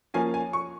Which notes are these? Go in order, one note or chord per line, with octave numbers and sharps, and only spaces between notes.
F3 A#3 C#4 G#5
G#5
C#6